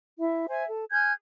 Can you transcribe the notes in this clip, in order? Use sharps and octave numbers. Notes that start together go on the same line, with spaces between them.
E4 E5
C5 E5 G#5
A4
G#5 F6 G6 G#6